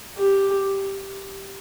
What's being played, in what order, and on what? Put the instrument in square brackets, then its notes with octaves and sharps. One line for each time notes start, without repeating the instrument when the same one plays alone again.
[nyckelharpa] G4